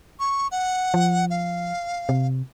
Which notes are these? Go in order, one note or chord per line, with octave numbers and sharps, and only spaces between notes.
C#6
F#5
F3
F5
C3